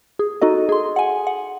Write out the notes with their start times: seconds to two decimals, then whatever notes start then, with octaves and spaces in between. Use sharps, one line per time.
0.19 G#4
0.42 D#4 F#4 A4 D#5
0.69 G#4 C6
0.96 F#5 G#5
1.27 F#5